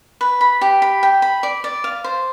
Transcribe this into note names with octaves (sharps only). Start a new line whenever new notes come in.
B4
B5
G4
B5
G5
B5
D5
D5
F5
C5